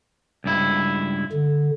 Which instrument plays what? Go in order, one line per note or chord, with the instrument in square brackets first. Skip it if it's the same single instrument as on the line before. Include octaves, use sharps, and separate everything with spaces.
[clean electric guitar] C#2 G2 E4
[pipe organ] D3